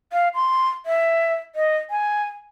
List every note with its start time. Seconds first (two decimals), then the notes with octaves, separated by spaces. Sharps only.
0.12 F5
0.34 C6
0.86 E5
1.55 D#5
1.90 G#5